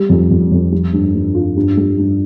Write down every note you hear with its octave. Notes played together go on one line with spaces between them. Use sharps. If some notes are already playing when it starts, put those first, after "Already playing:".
Already playing: G3
F2
F2
F2
G3
G2
G2
F4
G2
G3
G2